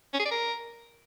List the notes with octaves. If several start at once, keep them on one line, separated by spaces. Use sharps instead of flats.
C#4
G#4
D5
A#4